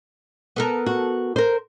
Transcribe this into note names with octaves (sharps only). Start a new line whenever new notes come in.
B3 A4 A#4
F#4
A#4 C5